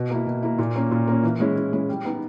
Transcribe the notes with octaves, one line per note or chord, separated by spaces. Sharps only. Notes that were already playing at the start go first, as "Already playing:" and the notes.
Already playing: B2
A#3 E4
B2
A#3 E4
A#2
A#3 C#4
A#2
A#3 C#4
E3
G#3 C#4 E4
E3
G#3 C#4 E4
G3
B3 D#4